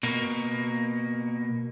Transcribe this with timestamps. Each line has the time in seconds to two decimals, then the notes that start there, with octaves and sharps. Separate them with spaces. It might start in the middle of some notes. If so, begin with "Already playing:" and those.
0.03 B2 A#3